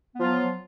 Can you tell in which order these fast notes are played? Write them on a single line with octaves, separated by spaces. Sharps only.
B3 F3 F4 F#3